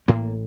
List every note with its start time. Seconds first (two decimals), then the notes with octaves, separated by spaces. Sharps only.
0.08 A1 A2 A#3